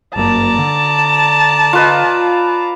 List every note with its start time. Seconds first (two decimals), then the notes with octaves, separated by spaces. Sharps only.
0.16 G1 F#2 A#3 D5 A5 A#5
0.59 D3
1.73 F4 B4 D#5